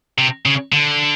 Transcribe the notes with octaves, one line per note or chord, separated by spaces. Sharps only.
C3
C#3
D3